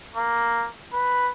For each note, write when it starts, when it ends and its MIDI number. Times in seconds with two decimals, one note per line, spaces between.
0.16 0.68 58
0.93 1.31 71